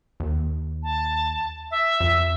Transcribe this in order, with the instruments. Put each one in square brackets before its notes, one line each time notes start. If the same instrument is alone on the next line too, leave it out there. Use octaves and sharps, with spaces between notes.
[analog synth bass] D#2
[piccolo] A5
E5
[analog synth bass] F2